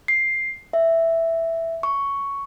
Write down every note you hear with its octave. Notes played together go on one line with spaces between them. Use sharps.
C7
E5
C#6